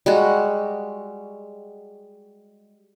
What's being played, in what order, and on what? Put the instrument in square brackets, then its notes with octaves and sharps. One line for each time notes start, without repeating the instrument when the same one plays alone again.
[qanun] G3 G#3 F#4